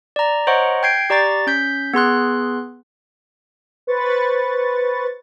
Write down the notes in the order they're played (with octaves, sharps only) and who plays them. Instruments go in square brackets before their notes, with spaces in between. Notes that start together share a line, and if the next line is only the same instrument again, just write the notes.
[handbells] D5 A#5
C5 C#5 D#5 F#5 A#5 C#6
G5 G6 G#6 C7 D7
G4 D5 A#5 C#6 A6
C#4 G6 B6
B3 G#4 C6 F#6
[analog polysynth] B4 C5 C#6 A6